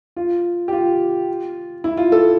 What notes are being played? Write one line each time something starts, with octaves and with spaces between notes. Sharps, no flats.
F4
G4
F4
E4
F4
A4